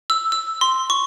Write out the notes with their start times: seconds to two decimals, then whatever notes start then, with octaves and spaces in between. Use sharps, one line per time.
0.10 E6
0.32 E6
0.61 C6
0.90 C#6